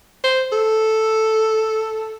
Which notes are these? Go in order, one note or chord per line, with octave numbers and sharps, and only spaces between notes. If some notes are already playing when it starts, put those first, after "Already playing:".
C5
A4